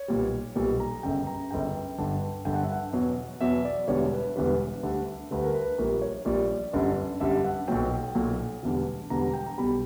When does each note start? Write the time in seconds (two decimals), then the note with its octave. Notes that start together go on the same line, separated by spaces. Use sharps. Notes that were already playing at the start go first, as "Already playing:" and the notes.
Already playing: C#5
0.08 B1 A#2 G3
0.56 B1 A#2 G3
0.80 A#5
1.03 G1 F#2 C#3 G5
1.27 A#5
1.51 G1 F#2 C#3 G5
1.98 G1 G2 D3
2.45 G1 G2 D3 G5
2.54 F#5
2.63 E5
2.72 F#5
2.93 E2 B2 F#3
3.41 E2 B2 F#3 E5
3.65 D5
3.88 E1 E2 D3 G3 C#5
4.12 B4
4.36 E1 E2 D3 G3 B4
4.83 D2 D3 G3
5.31 D2 D3 G3 B4
5.44 A#4
5.54 B4
5.78 A#1 A#2 G3 A#4
6.02 C#5
6.25 A#1 A#2 G3 D5
6.73 G1 F#2 D3 G3
7.20 G1 F#2 D3 G3 E5
7.44 F#5
7.68 B1 A#2 F#3 G5
8.15 B1 A#2 F#3
8.63 E1 E2 D3 G3
9.10 E1 E2 D3 G3 A#5
9.22 A#5
9.34 G5
9.47 A#5
9.58 B1 B2 G3 B5